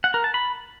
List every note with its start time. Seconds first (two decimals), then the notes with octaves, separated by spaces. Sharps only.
0.04 F#5
0.14 A#4
0.24 A5
0.34 B5